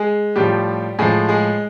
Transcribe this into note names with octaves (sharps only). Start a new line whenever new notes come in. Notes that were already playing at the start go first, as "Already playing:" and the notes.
Already playing: G#3 G#4
A2 F3 G3 G4
A2 F3 G#3 G#4
G#3 G#4